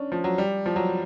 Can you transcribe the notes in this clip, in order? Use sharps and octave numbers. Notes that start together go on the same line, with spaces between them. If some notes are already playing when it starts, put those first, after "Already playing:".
Already playing: C#4 D4
F3
F#3
G3
F3
F#3